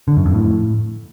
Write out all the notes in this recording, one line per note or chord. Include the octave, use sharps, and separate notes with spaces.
D3
F#2
F2
A2